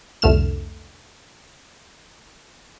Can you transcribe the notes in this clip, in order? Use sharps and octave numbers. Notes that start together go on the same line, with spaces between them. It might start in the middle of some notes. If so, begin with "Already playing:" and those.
C2 F2 D3 A3 F6 E7